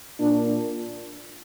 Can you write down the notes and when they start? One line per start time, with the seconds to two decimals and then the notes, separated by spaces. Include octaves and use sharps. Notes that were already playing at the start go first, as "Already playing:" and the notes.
0.20 A#2 D4